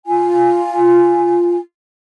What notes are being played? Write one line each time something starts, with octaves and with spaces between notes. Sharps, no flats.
F4 G#5